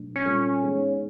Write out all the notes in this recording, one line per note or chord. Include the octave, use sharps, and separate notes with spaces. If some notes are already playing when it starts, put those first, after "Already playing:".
Already playing: B2 F#3 A3 D4
C#4
A#2 G3 C4 F4 A4
E3 G#3 B3 D#4 G#4